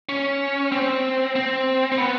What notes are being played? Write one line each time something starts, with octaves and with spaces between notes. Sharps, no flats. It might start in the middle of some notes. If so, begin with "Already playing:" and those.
C#4
C4
C4
C4
B3